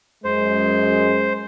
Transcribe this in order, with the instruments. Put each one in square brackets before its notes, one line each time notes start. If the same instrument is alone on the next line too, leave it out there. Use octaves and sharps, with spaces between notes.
[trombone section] F#2 G#3 [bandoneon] C5